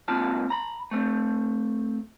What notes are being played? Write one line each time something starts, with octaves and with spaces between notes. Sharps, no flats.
C#2 A#3 C4 F4 A5
A#5 B5
A3 C4